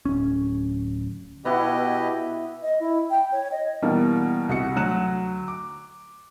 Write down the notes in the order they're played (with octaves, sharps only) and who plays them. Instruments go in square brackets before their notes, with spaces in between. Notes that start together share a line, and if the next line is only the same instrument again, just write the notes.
[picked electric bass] D1 C#4
[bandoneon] B2 G4 D#5 [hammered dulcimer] B3 E4 F#5
[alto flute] D#5
E4
G5
C#5
D#5
[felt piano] B2 E3 G3 A#3
C2 F#4 C#7
D2 F#3 F#6 E7
D6